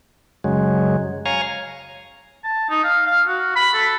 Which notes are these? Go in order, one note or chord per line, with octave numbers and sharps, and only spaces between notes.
F#2 C#3 F#3 G#3
C#5 F5 G#5 A#5
A5
D#4
F5
F5
F#4
B5
A4